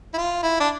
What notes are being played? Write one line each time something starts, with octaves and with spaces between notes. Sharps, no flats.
E4
F4
E4
D4